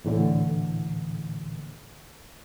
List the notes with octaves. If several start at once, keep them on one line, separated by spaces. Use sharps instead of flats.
D2 A2 D3 E3